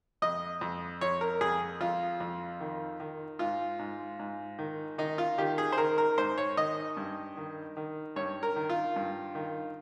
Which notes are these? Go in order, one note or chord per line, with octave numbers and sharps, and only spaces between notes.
F2 D#5
F2
F2 C#5
A#4
F2 G#4
F2 F4
F2
D#3
D#3
G#2 F4
G#2
G#2
D#3
D#3 D#4
F4
D#3 G4
G#4
C5
D#3 A#4
A#4
G#2 C5
C#5
D#3 D#5
G2
D#3
D#3
G2 C#5
A#4
D#3
F4
G2
D#3